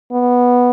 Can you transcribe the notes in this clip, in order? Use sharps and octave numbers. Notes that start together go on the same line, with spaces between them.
B3